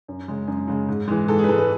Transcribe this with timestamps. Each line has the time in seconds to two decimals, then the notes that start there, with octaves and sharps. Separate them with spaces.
0.08 F#2
0.28 C#3 G#3
0.48 F#2
0.68 C#3 G#3
0.88 G#2
1.08 E3 G#3
1.28 G#2 A4
1.38 G#4
1.44 B4
1.48 E3 G#3 A4
1.58 B4